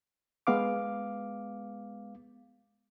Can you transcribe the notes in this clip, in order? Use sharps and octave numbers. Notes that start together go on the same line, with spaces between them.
G#3 B3 F5 D6